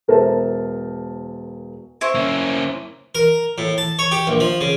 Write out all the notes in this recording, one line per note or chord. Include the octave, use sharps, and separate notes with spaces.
E1 A#4 C5 E5 A5
E4 C5 C#6
A#3 C#4
A#4
A2
A5
C#5
G4
A#1
F3
C#3